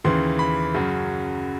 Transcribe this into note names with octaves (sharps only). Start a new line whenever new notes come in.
D#2 C#3 E3 C6
B5
F#2 C#3 F#3